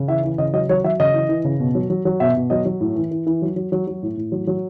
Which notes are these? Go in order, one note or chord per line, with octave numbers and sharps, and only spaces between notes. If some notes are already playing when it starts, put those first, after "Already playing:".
Already playing: C#3
E3 E5
E3
C#3 D#5
F#3 D#5
F#3 C#5
F#3 E5
C#3 D#5
E3
E3
C#3
B2
F#3
F#3
F#3
B2 E5
B2
F#3 D#5
F#3
A2
E3
E3
E3
F#3
F#3
F#3
F#3
A2
A2
F#3
F#3